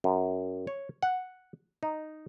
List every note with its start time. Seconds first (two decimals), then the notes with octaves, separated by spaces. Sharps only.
0.04 F#2
0.67 C#5
1.03 F#5
1.83 D#4